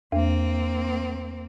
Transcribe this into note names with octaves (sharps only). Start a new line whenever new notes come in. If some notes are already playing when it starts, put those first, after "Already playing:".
E2 A#3 C4